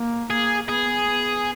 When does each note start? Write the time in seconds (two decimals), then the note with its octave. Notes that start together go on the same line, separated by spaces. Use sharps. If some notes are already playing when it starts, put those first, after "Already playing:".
Already playing: A#3
0.30 A#3 G#4
0.69 B3 G#4
1.08 B3